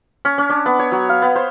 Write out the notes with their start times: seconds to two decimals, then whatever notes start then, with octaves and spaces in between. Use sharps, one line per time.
0.25 C#4
0.38 C#4
0.50 D4
0.66 B3
0.79 C#5
0.92 F#3
1.09 F5
1.22 B3
1.36 C5